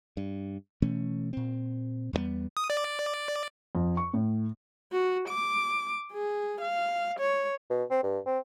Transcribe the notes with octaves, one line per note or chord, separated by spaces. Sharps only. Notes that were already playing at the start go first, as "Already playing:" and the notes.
G2
B2 E3 A3 C#4
A#2 C4
E2 G2 G3 B3
D#6
D5
F2
C#6
A2
F#4
D6
G#4
F5
C#5
B2
C4
G2
C4